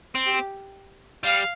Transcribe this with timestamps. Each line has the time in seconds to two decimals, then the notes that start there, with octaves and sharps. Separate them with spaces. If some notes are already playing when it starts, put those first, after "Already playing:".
0.15 C4
0.26 G4
1.24 G3 F5